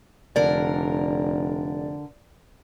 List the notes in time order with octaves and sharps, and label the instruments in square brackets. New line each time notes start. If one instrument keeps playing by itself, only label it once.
[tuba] F1 [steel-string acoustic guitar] D3 A#4 [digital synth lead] D5